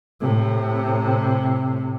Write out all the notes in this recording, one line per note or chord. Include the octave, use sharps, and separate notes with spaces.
A2 C3